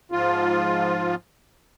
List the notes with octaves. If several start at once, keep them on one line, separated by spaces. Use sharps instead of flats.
G#2 F3 F4